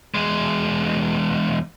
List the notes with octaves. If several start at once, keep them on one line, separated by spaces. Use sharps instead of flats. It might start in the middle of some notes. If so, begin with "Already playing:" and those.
E2 G#3